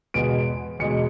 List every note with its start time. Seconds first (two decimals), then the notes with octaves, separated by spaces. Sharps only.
0.14 E2 B2 G#3 B3 D7
0.79 E2 B2 G#3 C#7